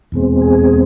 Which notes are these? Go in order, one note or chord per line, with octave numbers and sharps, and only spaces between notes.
E2 B2 G#3 C4
G#4